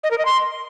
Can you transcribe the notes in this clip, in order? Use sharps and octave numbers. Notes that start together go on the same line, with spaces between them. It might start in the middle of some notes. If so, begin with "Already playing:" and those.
D#5
A#4
D#5
C6